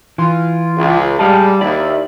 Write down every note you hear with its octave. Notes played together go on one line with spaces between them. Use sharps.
E3 F4
C#2
G3 G#3 D5 F5 A5
D#2 E4 D5